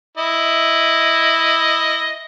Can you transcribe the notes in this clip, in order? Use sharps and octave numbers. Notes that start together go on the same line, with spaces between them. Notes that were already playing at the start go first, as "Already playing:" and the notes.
E4 D#5